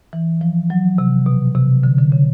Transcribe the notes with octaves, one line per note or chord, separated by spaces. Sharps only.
E3
F3
F#3
C3
B2
C3
D3
D3
C#3